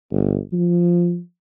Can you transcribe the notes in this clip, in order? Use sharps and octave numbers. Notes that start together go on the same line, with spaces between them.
G1
F3